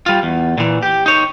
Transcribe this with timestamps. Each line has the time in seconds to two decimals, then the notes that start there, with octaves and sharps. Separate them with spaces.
0.06 G3 F4
0.23 E2
0.58 A#2 E3
0.83 G4
1.06 D#4 C#5